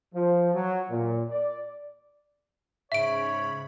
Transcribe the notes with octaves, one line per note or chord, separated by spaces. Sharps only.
F3
F#3
A#2
D5
G#2 C#3 C#5 E5 B5 D7